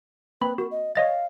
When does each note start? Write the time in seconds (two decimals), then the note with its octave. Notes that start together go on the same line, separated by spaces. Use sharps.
0.41 A#3 C4 B4 B5
0.58 F#4 A#4
0.71 D#5
0.95 C#5 D#5 F5 A6